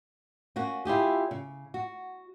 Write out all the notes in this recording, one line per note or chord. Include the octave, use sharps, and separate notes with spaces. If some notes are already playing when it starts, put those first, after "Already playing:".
A#3 C#4 F#4
E4 F4 G4 G#4
C#3
F#4